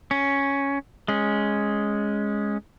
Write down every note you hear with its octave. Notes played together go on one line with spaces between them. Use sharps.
C#4
G#3 C#4